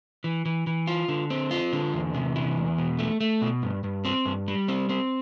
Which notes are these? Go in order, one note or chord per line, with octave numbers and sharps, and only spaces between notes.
E3
E3
E3
F4
D3
C4
F4
D3
E2
C3
E3
E2
B2
A3
A3
B2
G2
G2
C4
G2
G3
C4
C4